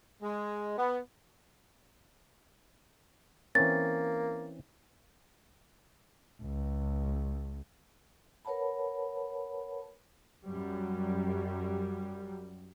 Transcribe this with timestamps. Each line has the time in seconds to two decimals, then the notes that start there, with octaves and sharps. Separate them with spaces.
0.22 G#3
0.78 B3
3.55 E3 A#3 C4 C#4 A6
6.43 C#2
8.45 A#4 B4 C#5 F#5 A5 B5
10.47 F#2 G3